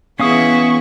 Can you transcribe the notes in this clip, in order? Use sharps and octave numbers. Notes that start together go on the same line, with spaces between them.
E3 B3 C#4 E4 G#4 F5 C#6 D#6